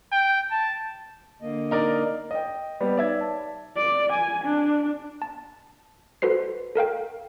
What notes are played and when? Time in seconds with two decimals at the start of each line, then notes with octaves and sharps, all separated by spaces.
0.12 G5
0.51 A5
1.42 D3 A#3 D#5
1.71 D#4 A#4 D5
2.31 D#5 G5
2.81 G3 B3 G4 B4 D5
2.97 D#4 C#5 D5 E5 G#6
3.21 A5
3.77 D5
4.12 G#5
4.44 D4
5.22 A5
6.22 F#4 A4 B4 C5 C7
6.75 A4 A#4 F5 G5